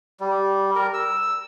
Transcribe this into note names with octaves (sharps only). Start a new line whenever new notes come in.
G3
A#4
E6